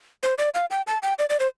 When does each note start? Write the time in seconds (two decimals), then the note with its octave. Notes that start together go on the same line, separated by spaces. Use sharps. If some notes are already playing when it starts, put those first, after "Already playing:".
0.23 C5
0.38 D5
0.54 F5
0.71 G5
0.87 A5
1.03 G5
1.19 D5
1.30 D5
1.40 C5